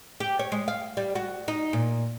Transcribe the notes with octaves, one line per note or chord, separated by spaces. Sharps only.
G4
C#5
G#3
F5
G3
F#4
D#4
A#2